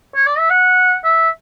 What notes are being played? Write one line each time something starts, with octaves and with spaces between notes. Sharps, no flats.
C#5
D5
E5
F#5
E5